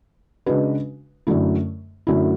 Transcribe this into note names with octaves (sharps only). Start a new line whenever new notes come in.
C#3 G#3 D4 F#4 B4
F#2 D3 F#3 A3 E4
F#2 D3 F#3 A3 E4